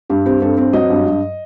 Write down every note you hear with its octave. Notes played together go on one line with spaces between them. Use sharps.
G2 G4
C4 G4
G2 A4
C4
F#3 D#5
G2
G2